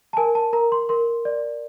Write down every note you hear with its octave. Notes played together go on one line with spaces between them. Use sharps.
A5
A#4 G#5
A5
A#4 A#5
C6
A#4 C6
D5